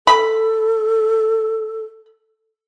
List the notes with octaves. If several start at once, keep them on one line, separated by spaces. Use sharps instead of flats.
A4 B5